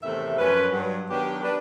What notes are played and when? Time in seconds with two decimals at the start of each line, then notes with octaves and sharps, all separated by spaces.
0.02 E2 A2 C3 D#3 A3 E5
0.38 F#2 F3 C#4 B4
0.70 G2 F#3
1.10 D#3 F#3 B3 D4 G4
1.43 D4 B4